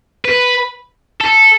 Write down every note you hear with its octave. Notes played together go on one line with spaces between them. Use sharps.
B4
A4